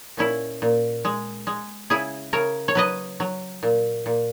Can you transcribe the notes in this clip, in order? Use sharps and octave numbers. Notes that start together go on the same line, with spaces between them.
A#2 C#4 E4
A#2
G#3
G#3
C#3 E4 G#4
C#3 A#4 C#5
C#5
F#3 B4 D#5
F#3
A#2
A#2